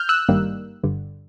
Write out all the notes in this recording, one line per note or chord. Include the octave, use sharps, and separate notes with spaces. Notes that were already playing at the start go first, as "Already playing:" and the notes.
Already playing: F6 G6
E6 F#6
G#1 G2 D#3 G3 A#3
G1 G2 D3